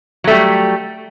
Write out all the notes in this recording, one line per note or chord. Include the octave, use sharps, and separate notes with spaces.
F#3 G3 A3